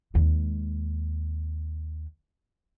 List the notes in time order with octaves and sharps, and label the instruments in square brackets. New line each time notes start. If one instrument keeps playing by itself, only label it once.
[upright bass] D#2 G#3